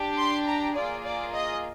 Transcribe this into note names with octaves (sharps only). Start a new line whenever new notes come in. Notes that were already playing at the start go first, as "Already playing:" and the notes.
Already playing: D4 G4
C6
A#5
A#3 F4 G#4 D5
D5
D#5